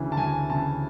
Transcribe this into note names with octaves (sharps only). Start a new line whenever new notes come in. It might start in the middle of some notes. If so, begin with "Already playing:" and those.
Already playing: D2 C#3 E3
A5
D2 G#5
C#3 E3 A5